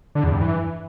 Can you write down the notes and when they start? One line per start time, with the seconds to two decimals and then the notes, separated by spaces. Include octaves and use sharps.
0.15 D3
0.24 E2
0.32 G2
0.41 E3